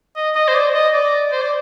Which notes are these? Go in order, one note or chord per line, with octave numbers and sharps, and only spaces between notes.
D#5
D#5
C5
D5
D#5
D5
C5
D5